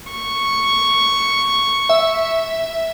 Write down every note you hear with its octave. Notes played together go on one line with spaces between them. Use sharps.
C#6
E5